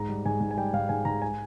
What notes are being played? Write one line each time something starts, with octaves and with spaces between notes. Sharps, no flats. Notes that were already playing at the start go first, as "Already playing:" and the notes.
Already playing: G#2 A#5
G3
G#2 G#5
G#2
G#5
G3 G5
G#2 F5
G#2 G#5
G#2 A#5
G#5